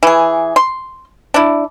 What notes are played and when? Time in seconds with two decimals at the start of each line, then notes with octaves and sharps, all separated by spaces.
0.03 E3 G#4
0.56 C6
1.34 D4 E4